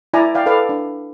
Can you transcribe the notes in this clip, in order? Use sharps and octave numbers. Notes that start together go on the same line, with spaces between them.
E4 D5 G#5 A#5
D5 F5 G5
A4 B4 D5 F5
D4